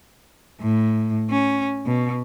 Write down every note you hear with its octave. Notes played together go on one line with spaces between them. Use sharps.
A2
C#4
B2